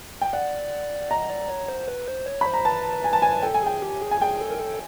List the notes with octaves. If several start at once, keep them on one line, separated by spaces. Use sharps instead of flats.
G5
D5 F#5
D#5 A#5
D5
C#5
C5
B4
C5
C#5
C5 B5
A#5
B4 A5
G#5
A5
G#5
A4 G5
G#5
G#4 G5
G4
G#4
G#5
G#4 G5
A4
A#4
A4